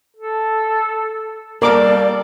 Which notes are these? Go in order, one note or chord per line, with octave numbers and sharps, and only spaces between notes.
A4
G3 A#3 A4 A#4 D5 D6